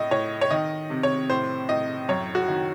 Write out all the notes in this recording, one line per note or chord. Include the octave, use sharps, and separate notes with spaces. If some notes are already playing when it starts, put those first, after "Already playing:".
Already playing: A2 D#5
A2 C#5
C#5
D#3 D#5
C3
C#5
A2 C5
A2 D#5
F#2 C#5
F#4
D#3